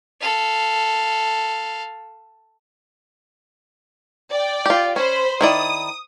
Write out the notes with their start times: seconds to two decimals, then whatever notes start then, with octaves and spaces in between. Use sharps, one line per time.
0.21 A4 F5
4.30 D5 G5
4.66 F4 G4
4.96 C#4 C5 B5
5.41 D#3 E4 D5 D#6